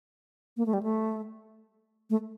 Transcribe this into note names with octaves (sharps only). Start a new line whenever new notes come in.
A#3
A3
G3
A3
A3